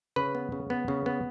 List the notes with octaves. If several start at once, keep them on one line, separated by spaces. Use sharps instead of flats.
C#3 B4
B3
C#3
B3
C#3
B3